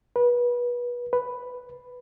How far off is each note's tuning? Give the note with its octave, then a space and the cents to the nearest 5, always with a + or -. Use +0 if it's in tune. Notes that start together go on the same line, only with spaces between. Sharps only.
B4 -25
B4 +5